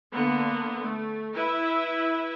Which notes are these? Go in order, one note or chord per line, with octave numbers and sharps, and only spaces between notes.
D3 A#3 B3
A3
E4 B4 E5